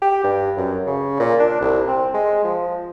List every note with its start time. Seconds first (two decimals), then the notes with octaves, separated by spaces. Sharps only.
0.02 G4
0.24 G2
0.57 F#2
0.87 C#3
1.20 A#2
1.40 D4
1.61 C2
1.88 C4
2.14 G#3
2.44 F3